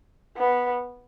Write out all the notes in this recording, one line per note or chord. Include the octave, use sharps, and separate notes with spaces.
B3